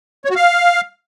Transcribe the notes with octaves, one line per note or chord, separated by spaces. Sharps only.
C#5
F#4
F5